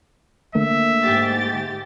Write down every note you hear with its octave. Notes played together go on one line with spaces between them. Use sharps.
D3 A3 A#3 E5
G#2 G4 A6